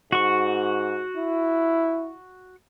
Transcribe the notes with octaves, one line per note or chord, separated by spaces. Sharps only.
G#2 F#4 C#6
E4